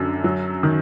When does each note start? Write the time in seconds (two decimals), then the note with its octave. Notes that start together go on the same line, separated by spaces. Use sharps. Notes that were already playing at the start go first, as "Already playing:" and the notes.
Already playing: F#2 D3
0.24 F#3
0.63 D#3